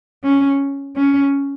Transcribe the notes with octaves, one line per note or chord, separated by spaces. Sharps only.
C#4
C#4